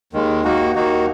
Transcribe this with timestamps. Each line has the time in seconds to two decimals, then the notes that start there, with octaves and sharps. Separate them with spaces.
0.13 D#2 D#3 G#3
0.44 D#2 D#3 A#3 D#4 F#4
0.75 D#2 D#3 A#3 D#4 F#4